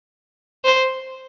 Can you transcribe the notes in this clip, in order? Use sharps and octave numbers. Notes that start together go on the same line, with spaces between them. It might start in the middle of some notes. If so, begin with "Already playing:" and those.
C5